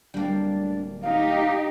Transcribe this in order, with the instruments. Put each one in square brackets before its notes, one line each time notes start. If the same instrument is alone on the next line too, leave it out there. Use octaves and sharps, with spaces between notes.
[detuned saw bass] D1 [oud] G3 A#3 [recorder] D4
[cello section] D#4 G4 [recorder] F5